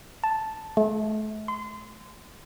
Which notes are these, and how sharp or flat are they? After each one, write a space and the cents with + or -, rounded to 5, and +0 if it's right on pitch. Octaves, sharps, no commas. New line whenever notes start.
A5 -5
A3 -40
C6 -30